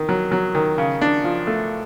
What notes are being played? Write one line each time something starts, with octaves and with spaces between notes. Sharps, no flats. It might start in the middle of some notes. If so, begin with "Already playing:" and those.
Already playing: D#3
F#3
F#3
D#3
C#3
D4
F3
A3